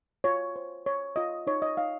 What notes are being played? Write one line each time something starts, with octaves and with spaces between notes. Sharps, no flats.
F4 C#5
C5
C#5
F4 D#5
D#4 C#5
D#5
D#4 F5